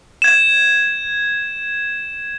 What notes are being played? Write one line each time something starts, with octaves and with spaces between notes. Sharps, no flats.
G#6 E7